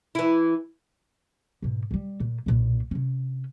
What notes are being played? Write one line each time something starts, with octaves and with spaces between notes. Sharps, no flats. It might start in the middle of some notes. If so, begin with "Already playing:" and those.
E3 E4
G#2 B2
F3 G3
A#2
B1 A#2
C3 C#4